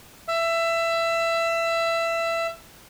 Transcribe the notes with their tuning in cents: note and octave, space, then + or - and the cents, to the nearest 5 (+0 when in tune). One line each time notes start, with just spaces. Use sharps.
E5 +20